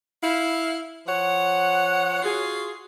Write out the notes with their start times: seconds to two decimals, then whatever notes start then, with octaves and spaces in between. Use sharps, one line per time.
0.22 E4 F5
1.07 F3 C#5 F#5
2.22 F4 F#4 G#4